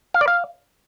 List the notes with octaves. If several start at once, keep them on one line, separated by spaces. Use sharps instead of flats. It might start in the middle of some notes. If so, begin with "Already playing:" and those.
F5
D5
F5